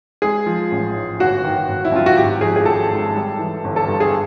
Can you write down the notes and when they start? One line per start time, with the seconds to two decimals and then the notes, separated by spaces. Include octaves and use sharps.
0.22 G#3 G#4
0.46 F3
0.71 A1
0.95 G#2
1.20 G1 F#4
1.44 D#3
1.68 G1
1.85 E4
1.92 F#2 F4
2.06 F#4
2.17 G#1 G4
2.41 F3 G#4
2.56 G#4
2.65 G#1 A4
2.91 G#2
3.15 G3
3.39 E3
3.64 G1
3.76 A4
3.88 G2
4.00 G#4